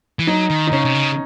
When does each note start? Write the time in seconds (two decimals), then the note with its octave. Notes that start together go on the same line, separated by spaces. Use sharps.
0.19 E3
0.27 F#3 D#4
0.50 D#3
0.67 D#4
0.72 C#3 C#4
0.85 C3
0.95 C#3